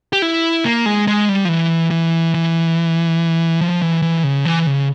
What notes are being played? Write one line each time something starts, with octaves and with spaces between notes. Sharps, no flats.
G4
E4
A#3
G#3
G#3
G3
F3
E3
E3
E3
F3
E3
E3
C#3
E3
C#3